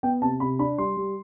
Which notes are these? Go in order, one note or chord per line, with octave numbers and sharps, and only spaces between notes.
B3 G5
C3 A5
C3 B5
D4 B5
G3 C6
G3